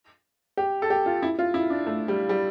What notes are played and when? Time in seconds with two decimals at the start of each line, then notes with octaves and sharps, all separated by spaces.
0.57 G4
0.82 A4
0.90 G4
1.06 F4
1.22 E4
1.39 F4
1.54 E4
1.70 D4
1.86 A3
2.08 G3
2.29 G3